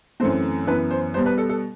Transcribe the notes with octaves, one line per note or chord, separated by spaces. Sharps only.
F#2 E3 A3 C4 C5
F#2 E3 B3 B4
C5
B2 G3 B3 C5
B4
A4
A4